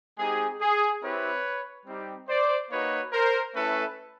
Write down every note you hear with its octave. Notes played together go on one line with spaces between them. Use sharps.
G#3 C4 D#4 G4 G#4
G#4
C4 E4 G4 B4 C#5
G3 C4 D#4 G4
C5 D5
A#3 D#4 F#4 B4 C#5
A#4 C5
A3 C#4 E4 A4 B4